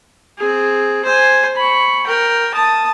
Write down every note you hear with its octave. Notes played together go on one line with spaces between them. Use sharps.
C4 G#4
C5 G#5
B5 C#6
A#4 G5
A5 D#6